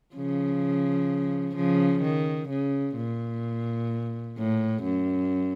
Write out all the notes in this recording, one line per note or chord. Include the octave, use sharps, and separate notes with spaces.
C#3 F3
C#3 F3
D#3
C#3
A#2
A2
F#2